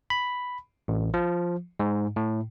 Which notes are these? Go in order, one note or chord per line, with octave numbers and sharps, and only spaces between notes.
B5
A1
F3
G#2
A2